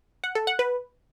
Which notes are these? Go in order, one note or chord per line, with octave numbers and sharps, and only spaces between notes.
F#5
A4
F#5
B4